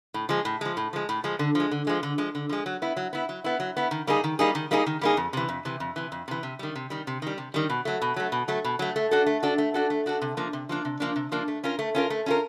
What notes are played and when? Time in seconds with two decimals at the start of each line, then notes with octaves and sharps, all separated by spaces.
0.14 A2
0.29 F3 G#3
0.45 A2
0.61 F3 G#3
0.77 A2
0.93 F3 G#3
1.09 A2
1.24 F3 G#3
1.39 D3
1.55 F3 G#3
1.71 D3
1.87 F3 G#3
2.03 D3
2.18 F3 G#3
2.35 D3
2.49 F3 G#3
2.66 F#3
2.82 B3 E4
2.97 F#3
3.13 B3 E4
3.29 F#3
3.44 B3 E4
3.60 F#3
3.77 B3 E4
3.91 D#3
4.07 G3 A#3 D#4 G#4
4.24 D#3
4.39 G3 A#3 D#4 G#4
4.55 D#3
4.71 G3 A#3 D#4 G#4
4.86 D#3
5.01 G3 A#3 D#4 G#4
5.17 F2
5.33 C3 E3
5.49 F2
5.65 C3 E3
5.80 F2
5.96 C3 E3
6.12 F2
6.28 C3 E3
6.43 C3
6.59 D#3 G3
6.75 C3
6.90 D#3 G3
7.07 C3
7.22 D#3 G3
7.38 C3
7.54 D#3 G3
7.70 B2
7.85 F#3 A3
8.02 B2
8.16 F#3 A3
8.32 B2
8.48 F#3 A3
8.64 B2
8.79 F#3 A3
8.96 A3
9.11 D4 F#4 A4
9.26 A3
9.43 D4 F#4 A4
9.58 A3
9.74 D4 F#4 A4
9.90 A3
10.06 D4 F#4 A4
10.21 C3
10.37 F3 A#3 D4
10.53 C3
10.69 F3 A#3 D4
10.85 C3
11.00 F3 A#3 D4
11.16 C3
11.32 F3 A#3 D4
11.48 A3
11.64 C#4 F4 A#4
11.79 A3
11.95 C#4 F4 A#4
12.10 A3
12.26 C#4 F4 A#4